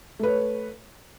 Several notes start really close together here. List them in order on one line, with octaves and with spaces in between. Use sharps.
A3 B4 C#5